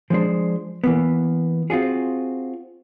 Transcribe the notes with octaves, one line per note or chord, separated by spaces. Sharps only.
F3 G#3 D4 C5
E3 A#3 B3
C4 F4 F#4 G#4